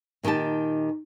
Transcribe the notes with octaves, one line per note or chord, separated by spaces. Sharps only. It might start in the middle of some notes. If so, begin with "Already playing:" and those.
A#2 D#3 D#4 G4 A5